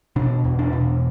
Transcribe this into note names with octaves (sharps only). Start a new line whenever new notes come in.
B2 D4
E2
D4
B2